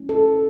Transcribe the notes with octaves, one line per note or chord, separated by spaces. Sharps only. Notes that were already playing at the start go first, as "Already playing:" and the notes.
Already playing: F#3 A3 C#4 E4
A4